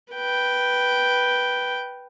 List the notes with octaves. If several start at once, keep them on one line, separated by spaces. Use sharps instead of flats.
B4 G5